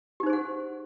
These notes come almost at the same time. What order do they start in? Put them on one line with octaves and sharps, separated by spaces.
G4 D#4 C5 G#4 F#5